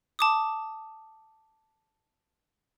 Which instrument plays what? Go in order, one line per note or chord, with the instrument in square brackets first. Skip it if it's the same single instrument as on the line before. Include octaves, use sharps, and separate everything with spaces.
[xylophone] A5 D6 D#6